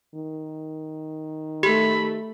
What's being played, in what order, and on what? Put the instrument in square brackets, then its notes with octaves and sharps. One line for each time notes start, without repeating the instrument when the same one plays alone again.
[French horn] D#3
[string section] A3 [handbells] G4 [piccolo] B5